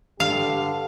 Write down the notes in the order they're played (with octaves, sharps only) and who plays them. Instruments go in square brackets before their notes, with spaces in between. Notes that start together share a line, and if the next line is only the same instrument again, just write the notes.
[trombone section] G2 D3 G4 [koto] F5